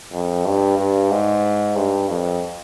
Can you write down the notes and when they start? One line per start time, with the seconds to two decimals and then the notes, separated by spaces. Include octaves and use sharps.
0.13 F2
0.45 G2
0.79 G2
1.11 G#2
1.76 G2
2.09 F2